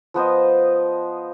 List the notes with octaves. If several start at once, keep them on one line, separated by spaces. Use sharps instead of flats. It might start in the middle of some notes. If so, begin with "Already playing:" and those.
F3 B3 C5 D#5